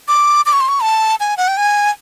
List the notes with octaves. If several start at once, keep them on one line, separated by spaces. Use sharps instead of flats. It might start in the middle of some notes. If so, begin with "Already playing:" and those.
D6
D6
C#6
C6
C#6
A5
G#5
F#5
G5
G#5